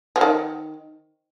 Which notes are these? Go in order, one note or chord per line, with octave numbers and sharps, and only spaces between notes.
F3
D#3